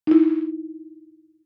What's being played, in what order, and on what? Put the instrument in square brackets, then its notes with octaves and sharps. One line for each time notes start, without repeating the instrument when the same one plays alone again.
[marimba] D#4 E4